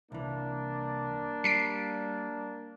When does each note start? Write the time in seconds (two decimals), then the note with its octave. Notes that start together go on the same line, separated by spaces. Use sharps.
0.12 C2 E3 A#3 D4
1.44 G3 B6 C7 D7